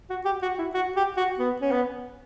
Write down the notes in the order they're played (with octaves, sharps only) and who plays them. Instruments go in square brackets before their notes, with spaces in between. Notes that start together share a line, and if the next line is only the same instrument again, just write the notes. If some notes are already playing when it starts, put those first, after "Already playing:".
[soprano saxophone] F#4
G4
F#4
E4
F#4
G4
F#4
B3
C#4
B3